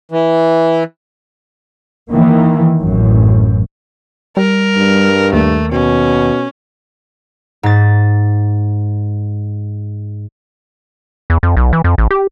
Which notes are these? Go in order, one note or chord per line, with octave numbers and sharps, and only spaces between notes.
E3
D#3 E3 A#3
A1 F#2
G3 A#4
G2
D#2 A3
B2 C#4
G#2 A6
E2
F2
B1
E3
F2
A1
G4